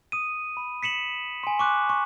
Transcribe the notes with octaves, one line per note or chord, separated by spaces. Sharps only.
D#6 D#7
B5
B6 C#7 E7 F#7
G#5 C6
C#6 D6 F#6
C#6